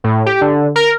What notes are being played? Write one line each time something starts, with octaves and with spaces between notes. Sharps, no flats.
A2
G4
D3
A#4